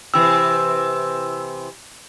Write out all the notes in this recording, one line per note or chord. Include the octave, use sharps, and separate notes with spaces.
C3 E3 E6